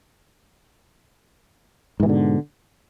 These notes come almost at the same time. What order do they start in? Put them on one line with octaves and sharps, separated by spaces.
G#2 E3 B2 D3